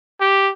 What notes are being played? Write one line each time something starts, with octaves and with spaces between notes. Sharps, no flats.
G4